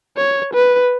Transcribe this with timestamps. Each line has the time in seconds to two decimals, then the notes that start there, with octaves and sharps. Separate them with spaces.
0.17 C#5
0.54 B4